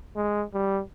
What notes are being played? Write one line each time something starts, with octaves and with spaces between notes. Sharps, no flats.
G#3
G3